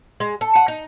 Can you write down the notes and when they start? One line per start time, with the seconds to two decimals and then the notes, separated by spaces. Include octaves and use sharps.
0.20 G#3
0.41 A4
0.55 F#5
0.68 D#4